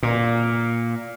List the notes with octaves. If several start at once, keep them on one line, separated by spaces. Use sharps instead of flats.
A#2